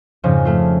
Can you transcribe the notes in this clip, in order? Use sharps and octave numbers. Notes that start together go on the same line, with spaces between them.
F2 G#2 C#3 F3
A3 F4